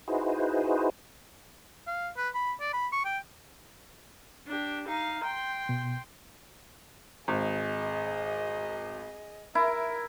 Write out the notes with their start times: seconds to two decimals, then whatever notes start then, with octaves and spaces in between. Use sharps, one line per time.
0.08 D#4 E4 F#4 G#4 B4 C5
1.87 F5
2.17 B4
2.34 B5
2.60 D5
2.73 B5
2.92 C#6
3.05 G5
4.48 D4 G4
4.88 D#4 F5
5.24 G5 C6
5.69 B2
7.28 G#1 G#4 D#5
9.55 E4 A#4